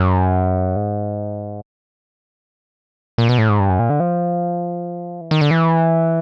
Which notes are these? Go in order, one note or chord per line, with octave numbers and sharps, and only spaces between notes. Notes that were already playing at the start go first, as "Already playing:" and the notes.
Already playing: F#2
G#2
A#2
B2
A2
G#2
G2
F#2
A#2
D3
F3
E3
D#3
D3
E3